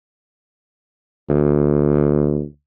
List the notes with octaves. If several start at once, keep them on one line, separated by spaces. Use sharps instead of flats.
D2